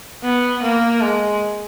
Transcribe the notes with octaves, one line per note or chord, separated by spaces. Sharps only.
B3
A#3
G#3